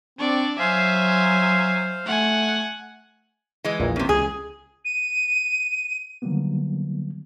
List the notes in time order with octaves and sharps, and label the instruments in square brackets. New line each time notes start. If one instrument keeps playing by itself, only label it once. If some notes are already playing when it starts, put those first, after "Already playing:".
[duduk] C4 [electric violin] D4 D5 [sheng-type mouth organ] C#6
[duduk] F#3 [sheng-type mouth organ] C5 F5 [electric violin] E5 G#5
[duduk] A3 [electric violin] F#5 G#5
[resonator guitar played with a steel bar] E3 G#3
[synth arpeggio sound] A#1 E2 A#2
[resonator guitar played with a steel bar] F#2 C3
[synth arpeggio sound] C#2 [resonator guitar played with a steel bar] G#4
[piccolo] D#7
[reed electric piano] D3 D#3 F#3 G3 A#3 B3